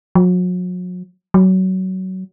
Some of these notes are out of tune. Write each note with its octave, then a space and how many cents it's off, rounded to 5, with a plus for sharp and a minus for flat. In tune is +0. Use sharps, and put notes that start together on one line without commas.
F#3 -40
F#3 +20